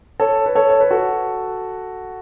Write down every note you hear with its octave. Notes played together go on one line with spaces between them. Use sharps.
A4 C#5
B4
A4 C#5
C#5
B4
F#4 A4